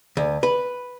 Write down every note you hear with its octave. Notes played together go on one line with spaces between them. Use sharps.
D2
B4